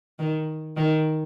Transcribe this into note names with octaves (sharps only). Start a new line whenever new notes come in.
D#3
D#3